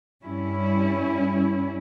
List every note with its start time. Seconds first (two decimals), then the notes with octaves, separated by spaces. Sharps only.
0.23 G2 G3 C#4 E4